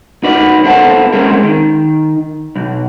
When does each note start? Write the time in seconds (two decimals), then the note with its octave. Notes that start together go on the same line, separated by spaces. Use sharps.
0.23 D#4 F#4 B4 D5
0.64 B3 C4 A4 C5 F#5 A5
1.13 G#3 A#3 C4 C#4 G#4 A#4
1.43 D#3
2.56 B1